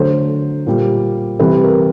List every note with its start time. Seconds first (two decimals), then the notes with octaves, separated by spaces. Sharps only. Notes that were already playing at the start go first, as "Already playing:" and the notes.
Already playing: D3 F#3 A3 C5
0.67 A#2 G3
1.39 C3 E3 G3 B4
1.64 A#4